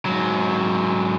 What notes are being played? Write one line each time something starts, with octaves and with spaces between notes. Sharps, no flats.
G#2 F#3